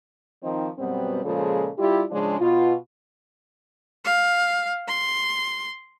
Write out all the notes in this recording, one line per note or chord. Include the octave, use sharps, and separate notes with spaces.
D#3 F3 C4 D#4
F#2 B2 G3 B3 C4
A#2 C#3 F3 G#3 A4
G3 E4 F4 G4
C#3 F3 G#3 D4
B2 F4
F5
C6